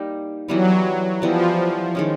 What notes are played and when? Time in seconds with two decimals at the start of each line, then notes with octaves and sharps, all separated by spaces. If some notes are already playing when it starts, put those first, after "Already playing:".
Already playing: G3 A#3 D#4
0.48 E3 F#3 G3 B3
1.22 E3 F3 G3 B3
1.95 D#3 G#3 C#4